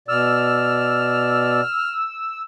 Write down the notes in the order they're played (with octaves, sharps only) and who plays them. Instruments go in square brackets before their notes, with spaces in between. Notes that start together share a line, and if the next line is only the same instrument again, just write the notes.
[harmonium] B2 D5 [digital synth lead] E6 [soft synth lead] F6